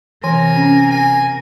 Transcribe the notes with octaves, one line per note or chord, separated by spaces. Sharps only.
C3 E3 A#4 G#5
C#4
G#5